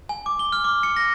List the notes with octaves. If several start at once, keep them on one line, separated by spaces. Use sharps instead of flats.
G#5
D6
G7
F6
D6
C#7
A#6